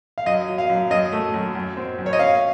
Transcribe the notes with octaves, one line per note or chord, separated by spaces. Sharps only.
F5
F#2 D#5
F#3
F5
F#2
F#2 D#5
A3
F#2
F#2
C4
F#2
C#5
D#5
C#4 F5